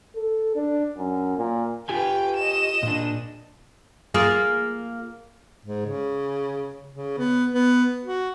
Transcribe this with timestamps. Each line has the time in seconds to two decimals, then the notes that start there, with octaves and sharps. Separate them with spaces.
0.16 A4
0.56 D4
0.98 F#2
1.38 A#2
1.89 F4 G4 B4 G5 G#5
2.36 D#5 E7
2.83 A#2 D4
4.14 A#3 F4 G#4
5.65 G#2
5.86 C#3
6.93 C#3
7.18 B3
7.51 B3
8.04 F#4